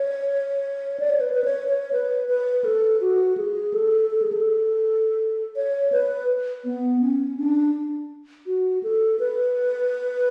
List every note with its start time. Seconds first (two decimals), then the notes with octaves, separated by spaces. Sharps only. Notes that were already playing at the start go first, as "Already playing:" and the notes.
Already playing: C#5
1.00 D5
1.10 C#5
1.20 B4
1.33 B4
1.44 C#5
1.68 C#5
1.93 B4
2.29 B4
2.64 A4
3.01 F#4
3.37 G#4
3.74 A4
4.11 A4
4.22 G#4
4.32 A4
5.56 C#5
5.92 B4
6.65 B3
7.01 C#4
7.37 D4
8.46 F#4
8.83 A4
9.19 B4